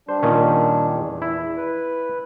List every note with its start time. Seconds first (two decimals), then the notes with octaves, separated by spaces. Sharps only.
0.09 G3 D4 C5
0.23 A#2 D#3 C#4
0.92 E2
1.22 E4
1.57 B4